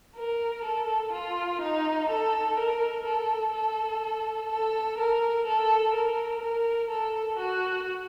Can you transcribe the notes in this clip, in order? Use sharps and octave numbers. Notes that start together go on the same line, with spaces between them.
A#4
A4
F4
D#4
A4
A#4
A4
A4
A4
A#4
A4
A#4
A#4
A4
F#4